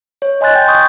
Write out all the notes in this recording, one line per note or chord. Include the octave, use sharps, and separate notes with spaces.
C#5
D#5 G#5 C6 F#6 A6
G5 G6
C6 C#6 D#6 G6